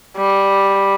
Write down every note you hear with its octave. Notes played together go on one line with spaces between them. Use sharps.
G3